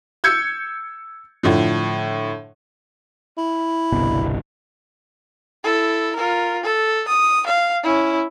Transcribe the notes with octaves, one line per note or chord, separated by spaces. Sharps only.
E6 G6 G#6 C#7
A2 D3 F3
E4
G1 C2 B2
E4 A4
F4 A#4
A4
D#6
F5
C#4 E4